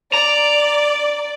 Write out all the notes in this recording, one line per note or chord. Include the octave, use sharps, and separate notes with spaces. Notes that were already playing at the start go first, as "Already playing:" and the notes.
D5 A#5